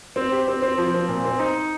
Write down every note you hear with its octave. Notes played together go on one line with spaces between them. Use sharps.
C4
G4
C4
C4
F3
C4
A#2
C4
D#4